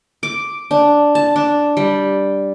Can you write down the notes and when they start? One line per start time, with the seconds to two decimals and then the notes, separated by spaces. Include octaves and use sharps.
0.23 D6
0.71 D4
1.15 A5
1.36 D4
1.77 G3